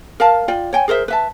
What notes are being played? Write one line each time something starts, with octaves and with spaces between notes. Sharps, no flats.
A#4 F5 A5
F4 D5 G5
C#5 G5 G#5
G#4 A#4 C5 E5
B4 E5 A5